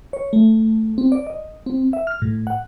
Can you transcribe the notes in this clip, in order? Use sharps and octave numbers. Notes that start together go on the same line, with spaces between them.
C#5
A3
C4
D5
D#5
C4
E5
F6
A2
F#5